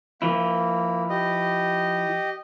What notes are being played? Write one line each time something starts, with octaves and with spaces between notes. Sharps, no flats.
F3 A#3 E4
G4 D#5